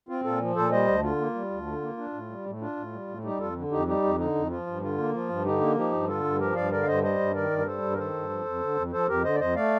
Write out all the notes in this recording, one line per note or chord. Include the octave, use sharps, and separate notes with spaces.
C4 F4
A#2 F4 A4
F3
A#2 A4 C5
G3 C5 D#5
D2
D3 F4
A#3
G3
D2
D3
A#3
D4
A2
G3
A2
D4 F4
A2
G3
A2
G3 D#4 G4
F2 F4 A4
D3
F2 D#4 G4
G3 D#4 G4
F2
D3 D#4
F2
F3 F4
G2
D3 F4
A#3
F3 F4
G2
D3 D#4 G4
A#3
F3 D#4 G4
G2
D3 F4 A4
G2
F3 G4 A#4
G2 D5 F5
D3 A#4 D5
F5
G2 C5 D#5
G3 C5 D#5
G2
D#3 A#4 D5
G2
A#4
G3 A4 C5
G2
A#4
D#3 A4 C5
G2
F3
F2
D3
F2
F3 A4 C5
F2 G4 A#4
D3 C5 D#5
D5
F2 C5 D#5
A3 D5 F5